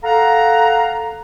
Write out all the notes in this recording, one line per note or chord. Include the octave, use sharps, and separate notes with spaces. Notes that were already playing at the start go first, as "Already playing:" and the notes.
A4 F5 F#5 A#5